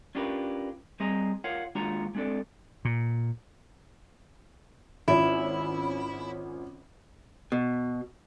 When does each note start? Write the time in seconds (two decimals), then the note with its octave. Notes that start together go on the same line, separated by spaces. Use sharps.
0.15 C#4 D4 F4 G4 A#4 B4
1.00 G3 C4 G#4 D#5 G#5 A#5
1.44 F4 A#4 C#5 F5 F#5
1.75 D#2 G#3 D4 F4 F#4 A#5
2.15 G#3 C4 D4 A4 D5
2.85 A#2
5.08 G#1 C#4 E4 F4
7.52 B2